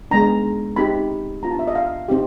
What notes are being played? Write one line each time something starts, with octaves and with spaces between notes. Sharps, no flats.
G#3 B3 D4 A#5
C4 D#4 G4 B5
B3 D4 F4 A#5
A5
E5
D#5
F5
C4 D#4 G4